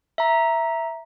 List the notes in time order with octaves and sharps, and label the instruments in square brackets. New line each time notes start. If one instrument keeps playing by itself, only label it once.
[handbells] E5 A#5